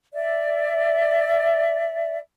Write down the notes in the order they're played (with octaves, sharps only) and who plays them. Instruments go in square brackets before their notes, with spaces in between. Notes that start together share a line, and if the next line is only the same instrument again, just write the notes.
[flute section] D5 E5